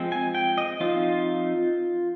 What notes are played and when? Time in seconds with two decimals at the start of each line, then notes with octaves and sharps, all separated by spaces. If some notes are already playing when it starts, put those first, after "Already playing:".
Already playing: F3 G#3 C4
0.12 G#5
0.35 G5
0.58 D#5
0.80 F3 C4 D#4 F4